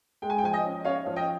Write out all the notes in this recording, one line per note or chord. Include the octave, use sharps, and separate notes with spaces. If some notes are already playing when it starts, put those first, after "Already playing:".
G#3 G5
G#5
G5
F3 G#5
D#5 G5
C#4
C#4 C#5 F5
F3
D#5 G5